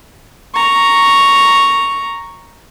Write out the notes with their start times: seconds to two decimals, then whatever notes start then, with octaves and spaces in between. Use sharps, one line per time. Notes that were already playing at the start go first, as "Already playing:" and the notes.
0.55 A#5 C#6